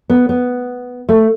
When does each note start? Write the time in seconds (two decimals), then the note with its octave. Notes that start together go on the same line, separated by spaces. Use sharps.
0.10 B3
0.29 B3
1.09 A3